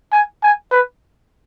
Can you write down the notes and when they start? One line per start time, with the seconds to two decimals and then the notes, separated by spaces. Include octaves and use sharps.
0.13 G#5
0.43 G#5
0.72 B4